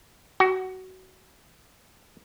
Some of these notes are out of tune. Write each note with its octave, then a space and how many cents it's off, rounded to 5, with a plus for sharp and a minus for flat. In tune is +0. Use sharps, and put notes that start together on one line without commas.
F#4 +20